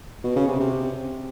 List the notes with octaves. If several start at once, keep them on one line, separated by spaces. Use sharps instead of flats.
B2
C#3
C3
C3